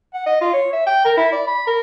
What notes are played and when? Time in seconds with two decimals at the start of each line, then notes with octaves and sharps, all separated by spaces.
0.14 F#5
0.26 D#5
0.41 F4
0.53 C#5
0.73 E5
0.87 G5
1.05 A#4
1.17 E4
1.32 D5
1.47 B5
1.67 A#4